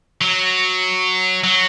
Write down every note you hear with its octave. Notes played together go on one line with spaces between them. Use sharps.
F#3
F#3